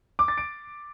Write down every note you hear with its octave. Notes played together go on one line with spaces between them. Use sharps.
D6
A6
D7